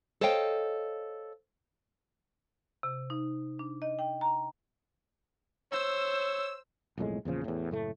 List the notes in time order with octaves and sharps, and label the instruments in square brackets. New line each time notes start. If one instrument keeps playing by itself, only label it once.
[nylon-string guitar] A4 C5 C#5 D#5 F5 G5
[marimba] C3
D#4
D4
D#5
G5
A#5
[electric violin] C5 [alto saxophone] C#5 [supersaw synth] E6
[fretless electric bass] B1 F2 A2 G#3
E2 A#2 C#3 F3
E2 A2
F#1 A2 A3